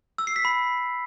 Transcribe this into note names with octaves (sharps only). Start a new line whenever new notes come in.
E6
C7
B6
B5